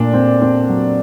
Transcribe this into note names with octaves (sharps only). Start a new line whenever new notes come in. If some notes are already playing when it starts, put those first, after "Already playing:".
Already playing: A#2 A3 D4
C4
C4
F#3